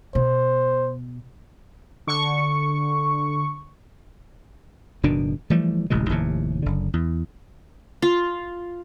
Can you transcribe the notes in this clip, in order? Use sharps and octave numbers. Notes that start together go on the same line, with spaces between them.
B2 C5
D3 C#6
F#1 B2 D#3 D4
E3 F3 G3 A3
D1 A1 C3 G#3
F1 D#2 A2 C3
F#1 D3
E2
F4